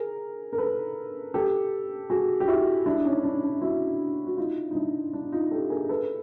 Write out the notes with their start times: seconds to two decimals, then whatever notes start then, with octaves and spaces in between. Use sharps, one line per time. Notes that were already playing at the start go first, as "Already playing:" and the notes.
Already playing: G#4 A#4
0.53 A#4
0.58 A4 B4
1.34 G4 A4
2.10 F#4 G#4
2.40 G4
2.48 E4 F#4
2.86 D4 E4
3.04 C#4 D#4
3.24 D4
3.43 D4
3.62 E4 F#4
4.27 F#4
4.37 D#4 F4
4.71 D#4
4.75 D4 E4
5.13 D4
5.32 D#4 F4
5.51 G4 A4
5.70 G#4 A#4
5.89 A4 B4